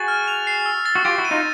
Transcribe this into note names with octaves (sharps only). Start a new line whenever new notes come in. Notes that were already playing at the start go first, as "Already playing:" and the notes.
Already playing: F#4 G#4 A6
F6
F7
C7
E6
A6
F#4
F4 G4 G6
E4 F#4
D#7
D#4 F4